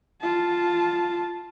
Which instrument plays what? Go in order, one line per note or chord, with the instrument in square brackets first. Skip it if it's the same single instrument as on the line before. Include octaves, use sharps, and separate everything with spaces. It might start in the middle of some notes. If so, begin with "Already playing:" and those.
[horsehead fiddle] F4 A5